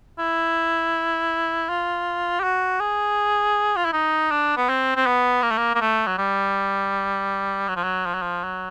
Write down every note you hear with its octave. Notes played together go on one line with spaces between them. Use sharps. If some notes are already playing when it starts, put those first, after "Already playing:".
E4
F4
G4
F#4
G#4
F4
E4
D#4
D4
B3
C4
C4
B3
A#3
A3
A#3
A#3
A3
F#3
G3
F#3
F3
F#3
F3
F#3
F3
F#3